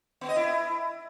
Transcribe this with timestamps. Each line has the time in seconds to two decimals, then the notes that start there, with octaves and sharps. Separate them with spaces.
0.21 B3
0.29 D#5
0.36 E4